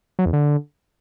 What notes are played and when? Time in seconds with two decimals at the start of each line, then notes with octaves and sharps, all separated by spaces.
0.19 F#3
0.26 E2
0.33 D3